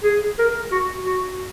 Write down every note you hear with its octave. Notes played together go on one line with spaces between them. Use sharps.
G#4
A#4
F#4
F#4